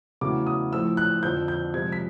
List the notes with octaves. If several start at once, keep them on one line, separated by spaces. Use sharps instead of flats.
E2 C#3 F#3 A3 D6
D#6
A2 F3 A3 E6
F#6
F2 D3 F3 G6
G6
C3 F3 G#3 G#6
B6